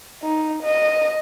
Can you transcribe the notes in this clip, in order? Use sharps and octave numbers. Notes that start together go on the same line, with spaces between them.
D#4
D#5